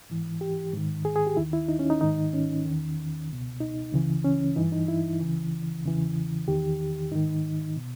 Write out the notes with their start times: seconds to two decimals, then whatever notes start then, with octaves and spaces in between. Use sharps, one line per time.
0.10 G#2 E3
0.41 G4
0.73 G#2 D#3
1.05 G#4
1.16 G#4
1.27 G4
1.37 D#2 D#3 E4
1.53 E4
1.68 D#4
1.79 C#4
1.90 D#4
2.01 G#2 D#3 D#4
2.33 C#4
2.65 E2 D#3
3.29 C#2 B2
3.60 D#4
3.93 C#2 C#3 E3
4.24 C#4
4.56 G2 E3 D#4
4.72 D#4
4.88 E4
5.20 C#2 C#3 E3
5.84 E2 C#3 E3
6.48 E2 D#3 G4
7.11 G#2 D#3 D#4
7.77 B2